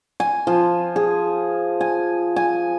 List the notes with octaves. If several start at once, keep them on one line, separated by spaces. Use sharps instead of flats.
G#5
F3
G#4
G#5
G#5